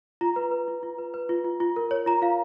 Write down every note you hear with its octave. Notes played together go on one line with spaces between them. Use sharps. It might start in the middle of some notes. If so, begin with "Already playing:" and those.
F4 A#5
B4
B4
F4
F4
B4
B4
F4
F4
F4
A#4
C#5
F4 A#5
F4 F5